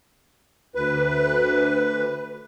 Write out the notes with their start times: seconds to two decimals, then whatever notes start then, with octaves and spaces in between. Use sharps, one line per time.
0.75 D2 B4